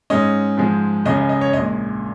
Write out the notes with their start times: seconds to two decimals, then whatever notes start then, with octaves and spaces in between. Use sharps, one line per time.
0.10 G#2 G#3 C#4 D#5
0.57 G#2 F3 G#3
1.05 C#2 C#3 G#3 C#4 D#5
1.17 D#5
1.29 D#5
1.41 C#5
1.53 A#1 A#2 G#3 D#5